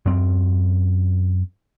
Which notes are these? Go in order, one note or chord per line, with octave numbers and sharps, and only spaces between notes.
F#2 C4